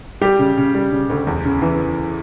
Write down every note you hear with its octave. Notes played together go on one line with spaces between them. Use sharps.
G3 G4
C#3
C#3
G3
C#3
D2
E2
C#3
E3